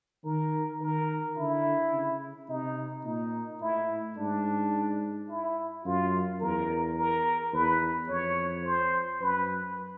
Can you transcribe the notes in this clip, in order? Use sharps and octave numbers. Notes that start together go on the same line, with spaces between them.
D#3 A#4
D#3 A#4
D3 E4
C#3
C3 D#4
A#2 D#4
A2 E4
G#2 D4
E4
F#2 F4
E2 A#4
A#4
E2 B4
F2 C#5
C5
F#2 B4